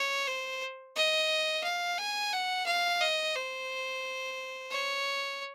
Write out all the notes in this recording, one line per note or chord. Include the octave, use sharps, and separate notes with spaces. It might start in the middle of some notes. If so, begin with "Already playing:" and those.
Already playing: C#5
C5
D#5
F5
G#5
F#5
F5
D#5
C5
C#5